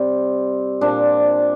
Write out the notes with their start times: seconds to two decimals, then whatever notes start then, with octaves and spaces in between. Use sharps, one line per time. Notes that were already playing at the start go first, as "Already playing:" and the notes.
Already playing: C3 G3 C4
0.81 A#2 F3 D4